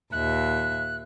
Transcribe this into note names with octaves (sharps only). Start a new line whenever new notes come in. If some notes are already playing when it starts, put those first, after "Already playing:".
D#2 A#2 E5 F#6